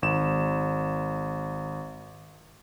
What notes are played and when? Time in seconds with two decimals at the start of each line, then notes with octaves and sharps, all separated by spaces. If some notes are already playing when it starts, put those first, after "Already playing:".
0.02 G#1 E7